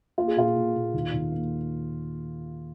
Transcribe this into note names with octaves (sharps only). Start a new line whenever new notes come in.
A#3 F4
G#4
A#2 F4
A#2
A#2
D#2
D#2
A#3